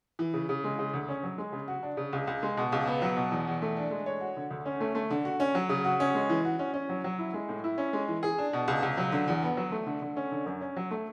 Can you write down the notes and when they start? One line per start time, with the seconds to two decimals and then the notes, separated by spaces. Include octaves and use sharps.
0.19 E3
0.33 C#3
0.49 C#3
0.64 G#3
0.79 C#3
0.94 D2
1.09 C#4
1.23 F#3
1.38 G#3
1.53 C#3
1.68 F#4
1.83 D4
1.97 C#3
2.13 C#2
2.27 C#2
2.43 G#3
2.57 B2
2.72 C#2
2.87 B3
3.02 F#3
3.16 B2
3.32 E2
3.47 E2
3.62 A3
3.77 D4
3.91 G#3
4.06 C#5
4.21 F#4
4.36 D3
4.51 D2
4.66 C#4
4.81 A3
4.95 A3
5.10 D3
5.25 F#4
5.40 C#4
5.55 F#3
5.69 C#3
5.85 F#4
6.00 C#4
6.15 G#3
6.29 E3
6.45 F#4
6.59 C#4
6.74 C#4
6.89 F#3
7.04 F#3
7.19 E4
7.34 G#3
7.49 A2
7.64 E4
7.78 C#4
7.93 G#3
8.08 E3
8.23 G#4
8.38 D4
8.53 B2
8.68 C#2
8.83 C#2
8.97 F#3
9.12 D3
9.28 E2
9.42 B3
9.57 F#3
9.72 A3
9.87 D3
10.02 D3
10.17 C#4
10.32 D3
10.46 F#2
10.61 C#4
10.76 F#3
10.91 A3